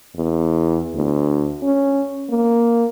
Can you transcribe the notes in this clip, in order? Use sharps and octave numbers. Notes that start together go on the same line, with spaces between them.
E2
D2
C#4
A#3